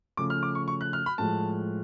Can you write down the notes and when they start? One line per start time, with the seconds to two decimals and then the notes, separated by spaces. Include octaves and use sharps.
0.17 C#3 F3 A3 D6
0.30 F6
0.43 D6
0.55 C#6
0.68 C#6
0.81 F#6
0.93 F6
1.06 B5
1.18 A2 F3 G#3 A5